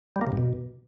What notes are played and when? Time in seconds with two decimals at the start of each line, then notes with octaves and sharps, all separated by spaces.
0.16 G3
0.21 A#3
0.27 C3
0.32 G2
0.37 B2